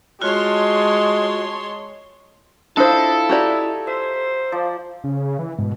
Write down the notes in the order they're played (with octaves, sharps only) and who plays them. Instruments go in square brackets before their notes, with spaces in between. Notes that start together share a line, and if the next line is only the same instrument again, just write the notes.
[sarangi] G#3 [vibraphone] F4 F#4 [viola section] C#5 A5 C6
[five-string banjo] D4 C5 [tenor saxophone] E4 [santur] F4 D#5 [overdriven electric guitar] A4 A5
[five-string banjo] F#4 G4 D5 [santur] F#5 G#5 A#5
[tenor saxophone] C5 [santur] E5
[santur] F3 D5
[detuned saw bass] C#3
E3
[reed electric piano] G#2 [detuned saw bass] B2